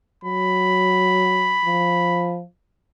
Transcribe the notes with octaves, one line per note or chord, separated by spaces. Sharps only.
F#3 B5
F3